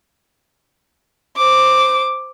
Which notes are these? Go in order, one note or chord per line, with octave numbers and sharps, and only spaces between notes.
C5 D6